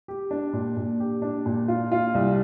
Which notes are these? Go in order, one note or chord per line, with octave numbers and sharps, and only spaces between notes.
G4
D4
A#2
A#2
G4
D4
A#2
F4
F4
C2